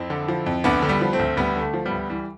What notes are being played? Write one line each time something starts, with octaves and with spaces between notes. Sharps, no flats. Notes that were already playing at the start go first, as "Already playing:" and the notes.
Already playing: F2 C4 E4
D3
F3
F2
D2 B3 D4
D3
G3 B3
F3
A3 C4
D2
D2 G3 B3
D3
A3
F3
G3 B3
D2
E3 G3